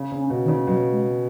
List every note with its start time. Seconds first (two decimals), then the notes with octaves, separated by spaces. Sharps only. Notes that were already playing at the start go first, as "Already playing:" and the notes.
Already playing: C#3
0.12 C#3
0.17 C#4
0.30 B2
0.43 D#3
0.48 C#3
0.67 B2 F#3
0.92 G#3